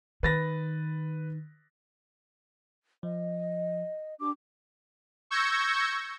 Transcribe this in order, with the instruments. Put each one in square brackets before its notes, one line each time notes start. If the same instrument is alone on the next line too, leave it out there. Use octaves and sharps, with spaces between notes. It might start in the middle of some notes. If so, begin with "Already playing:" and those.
[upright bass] D#3 [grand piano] B4 A6 A#6
[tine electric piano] F3 [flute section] D#5
[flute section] D4 G4 D6
[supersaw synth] C#6 E6 G6 G#6 A#6 C#7